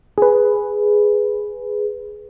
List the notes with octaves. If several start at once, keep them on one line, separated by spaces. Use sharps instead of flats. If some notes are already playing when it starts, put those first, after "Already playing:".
G#4 B4